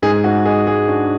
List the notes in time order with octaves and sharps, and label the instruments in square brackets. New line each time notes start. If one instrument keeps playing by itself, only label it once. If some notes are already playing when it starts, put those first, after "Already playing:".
[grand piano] G#2 G#4
G#2 F#4
G#3 G#4
G#3 G#4
D4 F#4